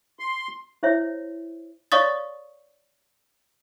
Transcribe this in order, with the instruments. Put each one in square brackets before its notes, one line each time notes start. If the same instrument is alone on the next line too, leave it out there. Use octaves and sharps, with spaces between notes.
[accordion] C6
[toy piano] E4 C5 C#5 E5
[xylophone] C#5 D5 F5 C#6 D#6 A6